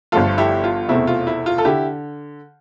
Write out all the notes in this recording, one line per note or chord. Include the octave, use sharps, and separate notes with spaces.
G1 G2 F3 A3 F4 A4
E4 G4
F4
F1 E2 B2 A3 C4 E4
F4
E4
F4
A4
D3 E4 G4